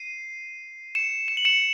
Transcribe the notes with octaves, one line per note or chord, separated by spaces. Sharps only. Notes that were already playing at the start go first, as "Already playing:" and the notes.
Already playing: C7 D#7
C#7 E7
E7
F#7
C#7 E7